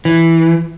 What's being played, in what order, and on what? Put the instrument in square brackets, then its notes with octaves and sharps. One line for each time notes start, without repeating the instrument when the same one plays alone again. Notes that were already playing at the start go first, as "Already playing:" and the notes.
[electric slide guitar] E3